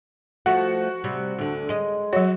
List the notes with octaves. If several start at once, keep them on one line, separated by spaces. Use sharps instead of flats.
F3 A3 F#4 F#5
C3 G3
D2 D3
G#3 D#5
F#3 F#4 C#5